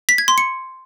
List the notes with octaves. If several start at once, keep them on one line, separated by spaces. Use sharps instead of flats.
B6
G#6
C6
C#7